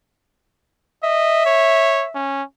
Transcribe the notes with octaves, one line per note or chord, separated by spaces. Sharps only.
D#5 E5
C#5
C#4